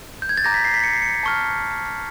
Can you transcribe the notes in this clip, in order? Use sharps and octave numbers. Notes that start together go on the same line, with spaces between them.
G6
G#6
A6
A#5 D6 G6 A#6
B6
C7
B6
C#7
C7
C#7
A5 C#6 F6